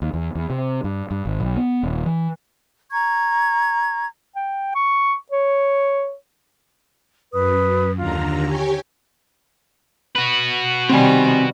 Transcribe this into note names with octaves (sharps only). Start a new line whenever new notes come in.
D#2
E2
E2
C3
G2
G2
G#1
B1
B3
D#1
E3
A#5 C#6 G#6
G5
C#6
C#5
F#2 B4 D#6
D#2 D3 F4 A#5
G4 C#5 G#5
F#4 B4
C3 D#3 G3 C4 G#5